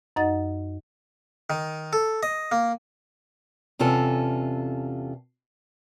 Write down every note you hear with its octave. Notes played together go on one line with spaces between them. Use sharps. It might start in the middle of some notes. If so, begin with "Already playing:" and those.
F#2 D#4 D#5 F#5 A6
D#3
A4
D#5
A#3
E2 C3 C#4 F4 A4 G#5